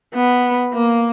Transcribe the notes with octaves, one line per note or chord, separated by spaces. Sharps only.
B3
A#3